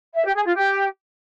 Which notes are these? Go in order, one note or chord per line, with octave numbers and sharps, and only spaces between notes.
E5
G4
G#4
F4
G4